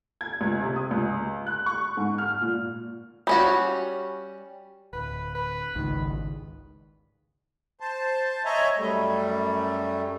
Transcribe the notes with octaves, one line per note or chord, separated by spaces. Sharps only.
G#6
C#2
C3
D#6
C#2
F#6
C#6
G#2
F6
A#2
G3 C#4 F#4
D1 B4
B4
G#1 C#2 D#3
C5 A5
C#5 D#5 E5 G#5 A#5
F#2 G3 A3